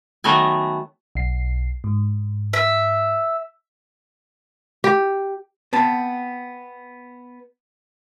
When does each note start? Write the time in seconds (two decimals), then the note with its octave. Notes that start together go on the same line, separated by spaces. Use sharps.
0.24 D#3 F#3 A3 B3 D#5 G#5
1.15 B1 C7
1.84 G#2
2.53 E5
4.84 G4
5.73 B3 C4 A5